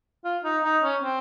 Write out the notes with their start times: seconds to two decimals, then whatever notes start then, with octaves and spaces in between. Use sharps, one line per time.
0.25 F4
0.44 D#4
0.64 D#4
0.83 C#4
1.02 C4